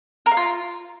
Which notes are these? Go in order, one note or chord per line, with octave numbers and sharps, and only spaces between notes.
A#4
F5
F4